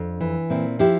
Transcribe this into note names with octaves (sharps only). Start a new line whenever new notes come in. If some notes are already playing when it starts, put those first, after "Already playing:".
Already playing: F2 D4
E3
A#2 C4 E4
F3 E4 G4